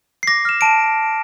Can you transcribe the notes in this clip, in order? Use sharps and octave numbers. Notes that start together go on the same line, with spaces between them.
C7
D6 A#6
F6 E7
A5 D7